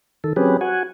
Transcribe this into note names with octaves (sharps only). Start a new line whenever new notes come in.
D#3 A4
F#3 C4 C#4 G4 G#4 B4
F#4 F#5 G#5